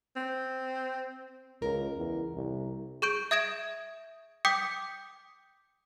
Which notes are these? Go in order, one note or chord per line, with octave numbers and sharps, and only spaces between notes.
C4
C#2 A#4
E2
C2
G#4 C#6 G6 D7
E5 D#6 G#6 A#6 D7 E7
G5 D6 D#6 G6 B6 C#7